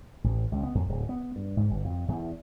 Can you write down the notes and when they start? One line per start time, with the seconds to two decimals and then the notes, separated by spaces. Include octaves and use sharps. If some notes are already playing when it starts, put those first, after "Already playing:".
0.24 A1
0.52 C#2
0.63 B3
0.75 F2
0.89 D1
1.09 B3
1.36 G2
1.57 G#2
1.70 G1
1.84 F2
2.08 E2